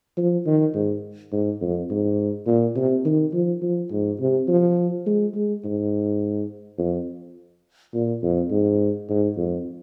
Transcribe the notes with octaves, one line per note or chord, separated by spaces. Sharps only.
F3
D#3
G#2
G#2
F2
G#2
A#2
C3
D#3
F3
F3
G#2
C3
F3
G#3
G#3
G#2
F2
A#2
F2
G#2
G#2
F2